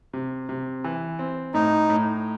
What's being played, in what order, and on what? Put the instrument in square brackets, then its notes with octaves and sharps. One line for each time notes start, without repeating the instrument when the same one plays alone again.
[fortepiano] C3
C3
E3
C4
[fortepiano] A2 [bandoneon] D#4
[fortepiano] A2